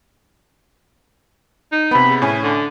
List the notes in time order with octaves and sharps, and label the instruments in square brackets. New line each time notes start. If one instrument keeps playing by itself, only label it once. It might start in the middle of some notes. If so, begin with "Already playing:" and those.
[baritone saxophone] D#4
[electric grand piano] C3 B3 [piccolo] B5
[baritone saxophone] C#3
[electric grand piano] A2 C#4 [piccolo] G#5
[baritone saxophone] D3